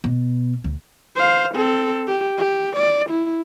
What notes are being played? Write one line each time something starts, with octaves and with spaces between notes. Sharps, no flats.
B2
D2
C5 F5
C4 A4
G4
G4
D5
E4